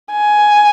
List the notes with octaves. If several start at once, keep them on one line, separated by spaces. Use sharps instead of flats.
G#5